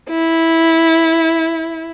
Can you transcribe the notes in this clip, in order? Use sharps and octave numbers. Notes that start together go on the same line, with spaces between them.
E4